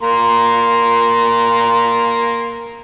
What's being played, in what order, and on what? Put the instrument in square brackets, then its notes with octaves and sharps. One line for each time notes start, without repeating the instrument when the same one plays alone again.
[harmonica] A#3 A#5 C6